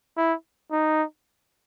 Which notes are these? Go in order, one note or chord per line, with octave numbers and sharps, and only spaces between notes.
E4
D#4